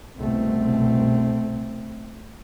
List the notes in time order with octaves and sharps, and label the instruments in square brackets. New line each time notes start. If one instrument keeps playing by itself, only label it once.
[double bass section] F#1 C2 B2 [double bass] A3 C4